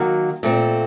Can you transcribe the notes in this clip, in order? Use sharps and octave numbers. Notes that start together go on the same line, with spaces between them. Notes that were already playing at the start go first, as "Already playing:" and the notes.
Already playing: D#3 F#3 A#3 F#4
A#2 A3 C4